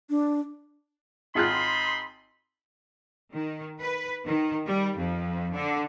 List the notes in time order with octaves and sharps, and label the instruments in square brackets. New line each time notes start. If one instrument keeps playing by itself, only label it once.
[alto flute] D4
[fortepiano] G#1 F4 F#6 [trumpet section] D#4 B5 C6
[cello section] D#3
B4
D#3
G3
F2
D3